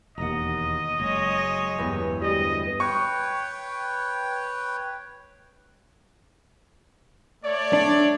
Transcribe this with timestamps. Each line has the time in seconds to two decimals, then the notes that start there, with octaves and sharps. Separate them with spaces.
0.18 E1 D#2 D#5 F#5 A#5
1.00 F#1 G#3 C#5
1.78 E2 G2 B3
2.22 D2 G3 D#5
2.80 B4 C#5 G5 C#6
7.44 A3 C#5 D5
7.73 D4